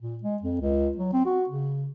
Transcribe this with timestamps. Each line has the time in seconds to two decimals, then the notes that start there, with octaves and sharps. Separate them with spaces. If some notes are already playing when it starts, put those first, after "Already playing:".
0.01 A#2
0.23 G#3
0.42 F2
0.61 C#2
0.97 F#3
1.13 C4
1.26 F#4
1.49 C#3